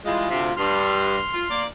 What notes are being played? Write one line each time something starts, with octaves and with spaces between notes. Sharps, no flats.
E3 G3 G#3 F4
D2 C3
G2 C6 F6
F4
A#3 D5